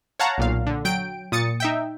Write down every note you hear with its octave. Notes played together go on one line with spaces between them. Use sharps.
C#5 F5 F#5 A5 A#5
B1 A#2 F5
D3
F#3 G5 D7
A#2 D#6 A6 C#7
D#4 E5 G5